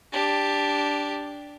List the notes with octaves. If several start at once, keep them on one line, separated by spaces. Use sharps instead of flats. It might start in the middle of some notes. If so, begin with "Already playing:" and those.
D4 G4